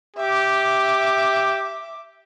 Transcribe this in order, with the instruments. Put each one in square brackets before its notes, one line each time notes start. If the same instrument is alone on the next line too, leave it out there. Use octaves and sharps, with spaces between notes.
[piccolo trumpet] G4 [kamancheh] E5 D6